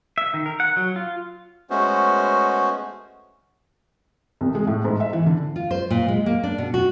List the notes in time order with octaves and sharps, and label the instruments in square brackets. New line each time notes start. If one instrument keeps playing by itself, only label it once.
[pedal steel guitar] E5
D#3
A#4
F#5
F#3
F4
[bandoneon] G#3 A3 B3 C#4 F#4 C5
[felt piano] C2
G#3
A2
G#2
E5
E3
D3
[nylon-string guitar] F4
C5
A#2
G#3
A#3
D4
B2
F#4